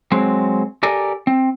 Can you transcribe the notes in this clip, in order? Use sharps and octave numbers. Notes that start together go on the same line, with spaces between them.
F#3 G#3 C4
G4 A4 A#4 D5 G#5
C4